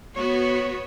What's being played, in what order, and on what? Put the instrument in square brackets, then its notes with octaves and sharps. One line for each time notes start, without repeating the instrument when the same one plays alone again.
[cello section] B3 F#4 C#5